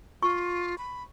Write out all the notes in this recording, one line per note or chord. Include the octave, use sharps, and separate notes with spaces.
F4 C#6
B5